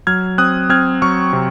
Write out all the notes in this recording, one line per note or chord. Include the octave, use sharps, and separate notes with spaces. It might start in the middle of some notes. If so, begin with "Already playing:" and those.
F#3 F6 G#6
C4 D#6 F#6
C4 F6 G#6
F#3 C#6 F6
C3